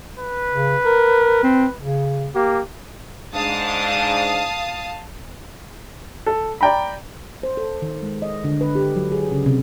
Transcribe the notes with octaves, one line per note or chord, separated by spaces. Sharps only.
B4
C#3
A#4
C4
C#3
A#3 G4
G#2 D4 F5 A5 D#6
A4
D5 G5 A#5 B5
C5
A4
D#3
G#3
D#5
D3
B4
G4
F#3
G#4
C#3
C3